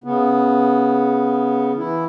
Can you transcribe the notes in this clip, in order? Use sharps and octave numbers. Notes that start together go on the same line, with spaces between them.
C#3 B3
E3 E4